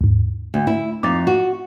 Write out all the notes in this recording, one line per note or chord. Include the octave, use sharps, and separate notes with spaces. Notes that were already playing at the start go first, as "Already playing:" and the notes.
D#2 G#2
D2
E4
F2 D#4 D6 A6 C7
F#4